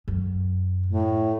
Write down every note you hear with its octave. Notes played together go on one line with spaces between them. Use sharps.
F#2
A2